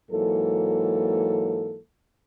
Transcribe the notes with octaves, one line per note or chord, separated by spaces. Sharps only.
G#2 E3 F#3 A#3 A4